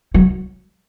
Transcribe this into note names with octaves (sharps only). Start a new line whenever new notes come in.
F#3